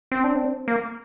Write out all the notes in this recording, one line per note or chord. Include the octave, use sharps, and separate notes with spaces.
C4
D4
C4
A#3